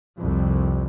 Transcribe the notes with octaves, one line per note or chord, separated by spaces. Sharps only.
C2 F2